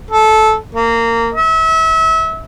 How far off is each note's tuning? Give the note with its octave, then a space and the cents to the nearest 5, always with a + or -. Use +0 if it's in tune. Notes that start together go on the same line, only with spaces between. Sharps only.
A4 -15
A#3 -20
E5 -30